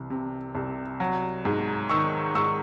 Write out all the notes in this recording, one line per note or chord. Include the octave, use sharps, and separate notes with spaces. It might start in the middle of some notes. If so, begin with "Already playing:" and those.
Already playing: C2 E3
C3
C2
F#3
G#2
D#3 C#6 E6
G#2 C#6 E6